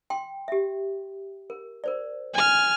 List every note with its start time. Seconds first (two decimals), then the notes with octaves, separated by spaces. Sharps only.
0.10 G5 C6
0.48 G4 E5
1.50 A#4
1.84 A#4 C5 D5
2.34 G#5 F6